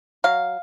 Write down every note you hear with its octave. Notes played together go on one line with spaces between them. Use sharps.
F#3 F5